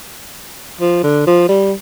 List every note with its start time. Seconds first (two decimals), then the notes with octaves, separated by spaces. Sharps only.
0.81 F3
1.03 D3
1.27 F3
1.49 G3